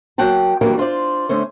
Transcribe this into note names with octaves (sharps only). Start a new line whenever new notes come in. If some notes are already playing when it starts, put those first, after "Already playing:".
F#3 A#3 F#5 G5 A5
D#3 E3 F#3 G3 A#3 D4
D4 F4 C5 D5
D3 A3 C#4 C5